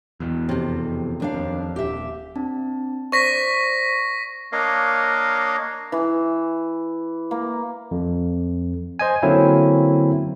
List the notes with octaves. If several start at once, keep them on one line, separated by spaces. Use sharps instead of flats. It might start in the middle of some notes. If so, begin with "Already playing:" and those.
E2 B2
F2 C3
D#2 D4 F5
F2
D#1 G4 E5
C4 D4 A5
C5 D5 C#6 A#6 B6
A#3 D4 A#4 C#5 D#5 F5
E3
A#3
F2
C5 D#5 G#5
D3 F#3 A#3 C4 C#4 E4